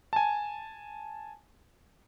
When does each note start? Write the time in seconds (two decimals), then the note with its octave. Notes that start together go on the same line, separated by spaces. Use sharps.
0.13 G#5 A5